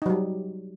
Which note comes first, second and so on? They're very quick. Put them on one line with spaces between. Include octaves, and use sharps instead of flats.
D#4 F#3 G3